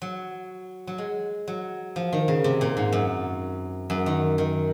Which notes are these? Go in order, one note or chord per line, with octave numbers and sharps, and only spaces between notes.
F#3
F#3
G#3
F#3
F3
D#3
C#3
C3
A#2
G#2
F#2
F#2
D#3
D#3